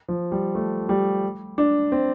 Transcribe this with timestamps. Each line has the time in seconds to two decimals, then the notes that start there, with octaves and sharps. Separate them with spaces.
0.08 F3
0.32 G3
0.55 A3
0.89 G3
1.58 D4
1.92 C4